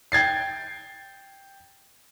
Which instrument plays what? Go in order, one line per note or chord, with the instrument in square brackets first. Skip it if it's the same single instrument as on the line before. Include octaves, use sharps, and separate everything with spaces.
[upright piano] G5 G#6 A6 C7